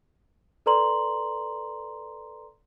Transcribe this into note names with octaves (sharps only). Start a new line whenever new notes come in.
A4 B4 D5 A#5 C6 F#7